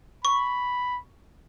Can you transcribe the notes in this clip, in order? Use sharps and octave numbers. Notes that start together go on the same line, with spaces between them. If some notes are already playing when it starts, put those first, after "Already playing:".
B5 C#6